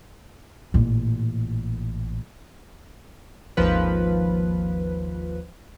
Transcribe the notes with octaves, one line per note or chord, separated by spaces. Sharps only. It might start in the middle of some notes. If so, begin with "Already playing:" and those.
A1 A#2
G#1 D#2 F3 B4